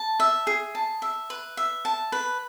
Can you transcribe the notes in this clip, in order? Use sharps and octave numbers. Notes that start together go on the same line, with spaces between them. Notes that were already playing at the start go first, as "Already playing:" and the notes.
Already playing: A5
E5
G#4
A5
E5
B4
E5
A5
B4